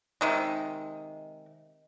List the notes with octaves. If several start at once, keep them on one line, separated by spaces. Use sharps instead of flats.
C3 D#3 G#3